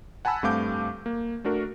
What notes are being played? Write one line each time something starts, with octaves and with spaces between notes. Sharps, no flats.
F#5 G#5 A5 B5 E6
G2 A3 C4 F5 D6 G6
A#3
A3 D4 F#4 A#4